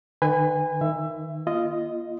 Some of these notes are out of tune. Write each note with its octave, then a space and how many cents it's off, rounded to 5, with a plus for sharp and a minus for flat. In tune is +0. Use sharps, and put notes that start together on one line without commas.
D#3 -40 B4 +20 G#5 -25
D#3 +0 E5 +20
A#3 +30 F4 -20 D#5 +0